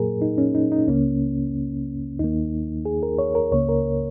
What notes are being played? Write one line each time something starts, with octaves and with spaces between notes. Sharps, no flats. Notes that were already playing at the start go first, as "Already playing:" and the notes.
Already playing: A#2 F#3 A#3 G#4 A#4
D#4
C#4
D#4
D#4
C#2 C#3 A#3 C#4
D#2 D#3 A#3 D#4
G#4
A#4
C#5
A#4
C#2 C#3 A#3 C#5
A#4